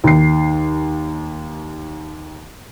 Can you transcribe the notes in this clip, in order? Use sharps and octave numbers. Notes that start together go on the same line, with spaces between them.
D#2 C7